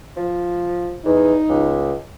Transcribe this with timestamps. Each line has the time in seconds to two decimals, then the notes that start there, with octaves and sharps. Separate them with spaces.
0.17 F3
1.05 E2 D#4
1.49 C#2